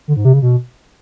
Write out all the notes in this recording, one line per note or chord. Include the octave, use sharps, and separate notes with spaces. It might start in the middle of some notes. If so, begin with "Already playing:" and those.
D3
G#2
C3
C#3
B2